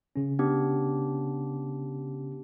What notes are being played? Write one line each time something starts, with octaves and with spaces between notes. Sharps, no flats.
C#3 C#4
B3 D4 G4